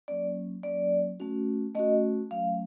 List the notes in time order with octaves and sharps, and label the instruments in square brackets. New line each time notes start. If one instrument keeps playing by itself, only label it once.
[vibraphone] F#3 A#3 C#4 D5
F#3 A#3 C#4 D5
A3 C#4 F#4
A3 C#4 F#4 D#5
F#3 A3 C#4 F5